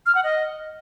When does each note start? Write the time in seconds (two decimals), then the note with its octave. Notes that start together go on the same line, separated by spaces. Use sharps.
0.06 F6
0.15 F#5
0.24 D#5